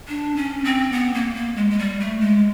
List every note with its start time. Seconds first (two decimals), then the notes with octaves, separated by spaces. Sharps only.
0.08 D4
0.36 C#4
0.65 C4
0.92 B3
1.14 A#3
1.35 A#3
1.57 G#3
1.70 G#3
1.79 G3
2.00 A3
2.21 G#3